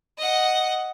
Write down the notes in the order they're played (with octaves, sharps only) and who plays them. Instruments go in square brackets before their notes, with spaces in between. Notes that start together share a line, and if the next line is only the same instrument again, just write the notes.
[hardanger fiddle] D#5 F#5